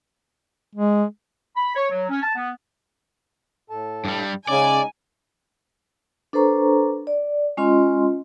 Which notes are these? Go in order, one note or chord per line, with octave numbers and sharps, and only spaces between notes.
G#3
B5
C#5
F#3
C#4
A5
B3
A2 A4 A5
G2 G3
C#3 G#3 C#4 D#4 D5 G#5
D4 A4 B4 C5 A#5 C#6
D5
G#3 C#4 F4 D#5 C6